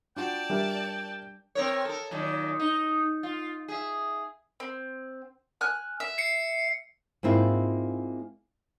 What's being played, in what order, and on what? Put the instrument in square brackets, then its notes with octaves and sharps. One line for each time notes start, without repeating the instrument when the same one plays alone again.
[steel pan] D4 F4 F#4 [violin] D5 A5 [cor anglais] G5
[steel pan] G3 D4 [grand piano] G4 A#4 E5
[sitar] C4 A#4 C#5
A4 A#4
F#2 A#2 D#3
D#4
F4
G#4 E5
[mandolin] C4
G#5 F6 F#6
E5
[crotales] C7 C#7
[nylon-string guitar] G#2 A#3 C4 E4 F4